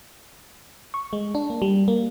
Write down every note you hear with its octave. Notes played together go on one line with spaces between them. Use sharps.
C#6
G#3
D4
A#3
G3
A#3